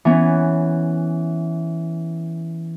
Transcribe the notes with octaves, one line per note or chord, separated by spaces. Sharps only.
E3 B3 C#4